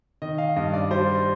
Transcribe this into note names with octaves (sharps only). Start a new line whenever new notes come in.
D#3 D#5
F5
G2 D#5
D5
G3 C5